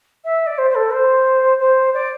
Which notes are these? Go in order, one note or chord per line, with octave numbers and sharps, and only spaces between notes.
E5
D5
C5
C5
A4
C5
C5
D5